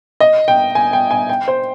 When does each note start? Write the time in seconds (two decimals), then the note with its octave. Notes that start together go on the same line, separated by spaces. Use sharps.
0.20 D#5
0.48 G5
0.75 G#5
0.93 G5
1.11 G#5
1.29 G5
1.48 C5